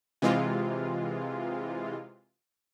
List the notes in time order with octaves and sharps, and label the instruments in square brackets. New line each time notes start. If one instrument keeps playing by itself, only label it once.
[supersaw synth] C3 E3 G#3 F4